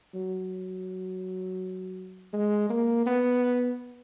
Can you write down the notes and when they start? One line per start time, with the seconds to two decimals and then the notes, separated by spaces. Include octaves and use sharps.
0.14 F#3
2.33 G#3
2.69 A#3
3.06 B3